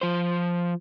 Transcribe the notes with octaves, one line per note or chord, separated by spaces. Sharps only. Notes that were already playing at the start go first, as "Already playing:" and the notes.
F3 C5